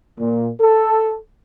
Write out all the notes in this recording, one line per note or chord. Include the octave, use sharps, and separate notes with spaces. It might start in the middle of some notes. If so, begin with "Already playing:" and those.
A#2
A4